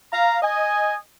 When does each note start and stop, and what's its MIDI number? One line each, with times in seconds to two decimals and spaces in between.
0.12 0.38 77
0.12 0.38 82
0.43 0.95 75
0.43 0.95 80